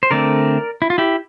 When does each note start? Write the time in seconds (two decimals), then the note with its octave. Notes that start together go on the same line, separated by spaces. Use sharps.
0.03 C5
0.11 D3 A3 C4 A#4 D5
0.82 E4
0.90 F4
0.98 E4 G4